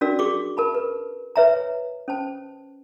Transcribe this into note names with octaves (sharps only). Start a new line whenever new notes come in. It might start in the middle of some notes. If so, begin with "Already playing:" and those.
C#4 D4 F#4 A#4 D5 E6
F#4 G#4 C#6 D6
A#4 A5 B5
B4
B4 C#5 E5 G#5 A#5
C#4 C5 A5